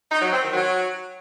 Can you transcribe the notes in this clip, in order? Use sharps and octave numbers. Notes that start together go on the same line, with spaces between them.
D#4
F#3
C4
D#3
F#3